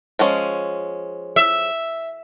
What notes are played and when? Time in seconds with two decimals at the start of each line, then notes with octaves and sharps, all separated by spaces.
0.19 F3 G#3 C#4
1.36 E5